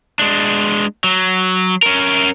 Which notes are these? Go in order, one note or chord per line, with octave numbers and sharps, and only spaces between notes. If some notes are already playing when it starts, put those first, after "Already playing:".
G#3 D4
F#3
C#4 A#4